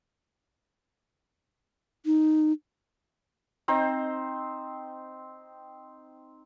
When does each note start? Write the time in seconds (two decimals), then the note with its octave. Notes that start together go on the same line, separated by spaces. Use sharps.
2.06 D#4
3.68 C4 D#4 C5